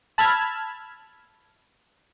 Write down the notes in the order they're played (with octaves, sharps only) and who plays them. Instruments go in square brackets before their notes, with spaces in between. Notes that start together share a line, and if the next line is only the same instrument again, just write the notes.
[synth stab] A5 B5 E6 F6 G#6